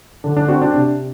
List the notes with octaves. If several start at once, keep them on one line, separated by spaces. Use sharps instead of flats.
D3 D4
D4
C4 F#4
D4
C3